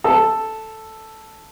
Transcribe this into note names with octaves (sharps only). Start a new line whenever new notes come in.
A4